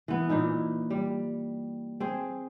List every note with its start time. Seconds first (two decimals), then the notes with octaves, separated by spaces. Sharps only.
0.08 E3 B3
0.29 A#2 E3 D#4 E4
0.90 G3
2.00 C4 G#4